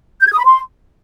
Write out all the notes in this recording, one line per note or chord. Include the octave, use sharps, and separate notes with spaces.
G6
G#6
D#6
B5
C6